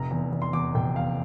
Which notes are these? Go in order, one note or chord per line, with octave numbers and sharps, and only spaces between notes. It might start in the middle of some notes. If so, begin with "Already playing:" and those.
Already playing: F1 A#5
E2
E2
C6
E2 D6
F1 G5
E2 F5